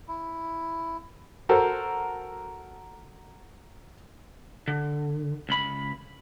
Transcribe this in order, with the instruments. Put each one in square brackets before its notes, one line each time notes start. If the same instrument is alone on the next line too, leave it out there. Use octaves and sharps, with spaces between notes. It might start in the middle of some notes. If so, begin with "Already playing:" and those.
[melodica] E4
[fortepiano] F#4 A4 A#4 C5
[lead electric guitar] D3
C#2 B5